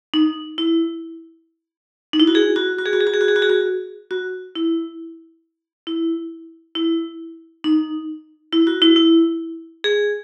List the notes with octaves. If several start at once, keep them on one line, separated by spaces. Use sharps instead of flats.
D#4
E4
D#4
E4
F#4
G#4
F#4
F#4
G#4
F#4
G#4
F#4
G#4
F#4
G#4
F#4
G#4
F#4
F#4
E4
E4
E4
D#4
E4
F#4
E4
E4
G#4